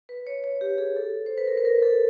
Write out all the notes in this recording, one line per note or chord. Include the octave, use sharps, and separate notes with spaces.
B4
C#5
C#5
G4
G#4
A4
C5
B4
A#4
B4
A#4
A4